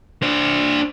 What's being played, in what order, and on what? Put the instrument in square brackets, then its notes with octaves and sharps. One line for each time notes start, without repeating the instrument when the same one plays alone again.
[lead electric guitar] D4 C5